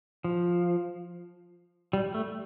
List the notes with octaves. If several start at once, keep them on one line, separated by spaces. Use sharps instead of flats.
F3
G3
A3